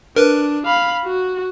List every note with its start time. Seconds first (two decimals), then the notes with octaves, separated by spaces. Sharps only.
0.16 D4 A#4 B4
0.66 F5 B5
1.04 F#4